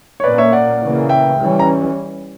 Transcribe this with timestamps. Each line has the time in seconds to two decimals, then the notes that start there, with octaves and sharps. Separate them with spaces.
0.20 C#5
0.24 A#2 A#3 C#4 B4 D5
0.38 C#5 E5
0.52 D5 F#5
0.82 C#3 E3 A#3 C#4
1.09 E5 G5
1.38 E3 G3 C#4
1.59 A#5